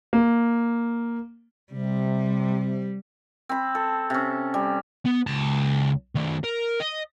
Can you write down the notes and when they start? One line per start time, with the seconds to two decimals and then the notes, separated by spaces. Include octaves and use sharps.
0.13 A#3
1.73 C3 G3
3.49 C4 B5
3.75 A4
4.10 C3 C#4
4.54 G3
5.05 B3
5.27 C#2 A5
6.15 D#3 A3
6.44 A#4
6.80 D#5